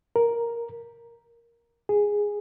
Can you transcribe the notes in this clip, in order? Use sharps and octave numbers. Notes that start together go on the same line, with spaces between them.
A#4
G#4